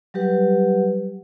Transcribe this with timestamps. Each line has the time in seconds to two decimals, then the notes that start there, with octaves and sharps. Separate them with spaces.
0.14 F#3 G3 G4 B4 F#5